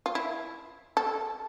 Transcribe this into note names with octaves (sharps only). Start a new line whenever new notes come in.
F4
E4
A4